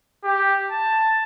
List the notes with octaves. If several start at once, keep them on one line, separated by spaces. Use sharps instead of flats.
G4
A5